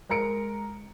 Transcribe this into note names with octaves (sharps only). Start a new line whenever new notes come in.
G#3 A#4 A#5 C#7 D7